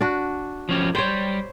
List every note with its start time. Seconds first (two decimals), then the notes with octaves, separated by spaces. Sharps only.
0.01 D4 F#4
0.69 F3 C#4 G4
0.95 G3 C5 C#5 G5